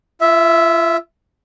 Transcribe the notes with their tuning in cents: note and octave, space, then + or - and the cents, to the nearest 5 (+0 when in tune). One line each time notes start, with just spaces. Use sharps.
F4 -40 E5 +0